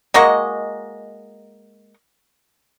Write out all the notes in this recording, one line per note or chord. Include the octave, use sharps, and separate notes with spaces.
G#3 A#3 F#4 D#5